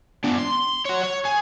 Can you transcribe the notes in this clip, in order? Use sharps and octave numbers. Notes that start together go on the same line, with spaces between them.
B3 D4
C6
C#5 F#5
C#5
G#4